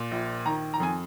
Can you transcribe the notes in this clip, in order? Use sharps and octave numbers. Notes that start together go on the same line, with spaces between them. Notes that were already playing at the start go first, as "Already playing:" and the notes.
Already playing: A#2
A#1
D#3 A#5
A#5
F2 G#5